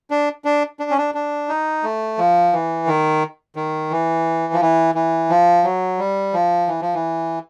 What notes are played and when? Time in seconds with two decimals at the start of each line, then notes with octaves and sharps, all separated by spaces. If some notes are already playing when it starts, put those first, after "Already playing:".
0.11 D4
0.45 D4
0.80 D4
0.90 C#4
0.98 D4
1.15 D4
1.49 D#4
1.83 A3
2.18 F3
2.53 E3
2.87 D#3
3.56 D#3
3.91 E3
4.53 F3
4.61 E3
4.95 E3
5.30 F3
5.64 F#3
5.99 G3
6.34 F3
6.67 E3
6.81 F3
6.94 E3